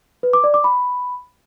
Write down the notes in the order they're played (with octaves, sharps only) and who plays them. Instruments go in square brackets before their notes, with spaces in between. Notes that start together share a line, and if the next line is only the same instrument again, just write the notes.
[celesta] B4
D6
D5
D6
B5